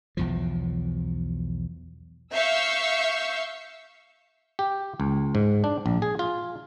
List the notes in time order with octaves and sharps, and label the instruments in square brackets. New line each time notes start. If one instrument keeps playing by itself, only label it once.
[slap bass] B1 E2 F3
[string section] E5 F5 C#6 E6 G6
[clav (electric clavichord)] G4
C#2
G#2
D4
A#1
G#4
F4